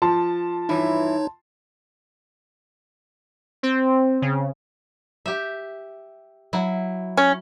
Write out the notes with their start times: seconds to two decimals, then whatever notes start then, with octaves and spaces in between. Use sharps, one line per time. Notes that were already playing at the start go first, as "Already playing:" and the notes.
0.02 F3 A5 C6
0.69 G2 E3 D#4 E4 C#5
3.63 C4
4.22 C#3
5.26 G4 E5
6.53 F#3 E4
7.17 C#4